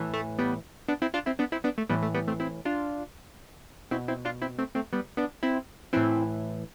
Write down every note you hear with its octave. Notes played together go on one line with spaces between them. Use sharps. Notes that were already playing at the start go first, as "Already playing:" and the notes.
Already playing: A2 E3
A3
G3 B3
B3 D4
C4 E4
D4 F4
C4 E4
B3 D4
C4 E4
B3 D4
A3
A2 E3 G3 B3
A3
G3 B3
A3 C4
C4 E4
D4 F4
B2 C4 E4
C4 E4
D4 F4
C4 E4
A3 C4
A3 C4
G3 B3
B3 D4
C4 E4
A2 E3 C4 E4